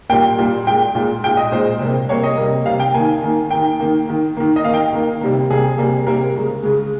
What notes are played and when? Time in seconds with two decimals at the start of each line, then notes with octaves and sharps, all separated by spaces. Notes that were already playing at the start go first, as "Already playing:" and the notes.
0.09 A#2 G3 A#3 G5
0.38 A#2 G3 A#3
0.67 A#2 G#3 G5
0.95 A#2 G#3
1.23 A#2 G#3 G5
1.37 D#5
1.52 A#2 G#3 C5
1.80 C3 G3 A#3
2.09 C3 G3 A#3 C#5
2.23 D#5
2.37 C3 G3 A#3
2.66 C3 G3 A#3 F5
2.80 G5
2.94 D#3 A#3 G#5
3.22 D#3 A#3
3.51 D#3 A#3 G5
3.80 D#3 A#3
4.08 D#3 A#3
4.37 D#3 A#3
4.56 D#5
4.64 A#3 F5
4.69 D#3 G5
4.93 D#3 A#3
5.21 C3 G3 A#3
5.51 C3 G3 A#3 G#4
5.78 C3 G3 A#3
6.07 C3 G3 A#3 A#4
6.36 C#3 G#3
6.63 C#3 G#3